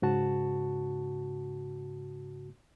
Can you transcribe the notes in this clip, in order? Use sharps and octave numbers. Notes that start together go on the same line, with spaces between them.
G#2 C#3 F#4 A5